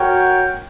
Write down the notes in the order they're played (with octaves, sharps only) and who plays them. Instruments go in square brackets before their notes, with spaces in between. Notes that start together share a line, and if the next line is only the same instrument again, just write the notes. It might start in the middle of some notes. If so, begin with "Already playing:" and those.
Already playing: [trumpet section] F#4 A#4 C#5 G5